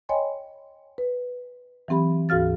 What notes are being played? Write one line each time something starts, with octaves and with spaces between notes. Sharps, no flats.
C#5 D#5 G5 G#5 B5 C6
B4
E3 F#3 C4 G4 B5
D2 G#2 F#4 F5 F6 A6